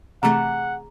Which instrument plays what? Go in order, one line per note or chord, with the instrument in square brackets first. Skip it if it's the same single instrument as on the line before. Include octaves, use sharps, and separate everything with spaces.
[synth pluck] C3 E3 A3 [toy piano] G#4 A#5 [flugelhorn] F#5